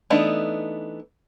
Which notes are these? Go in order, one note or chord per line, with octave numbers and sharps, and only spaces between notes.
E3 A3 B3 D4 D#4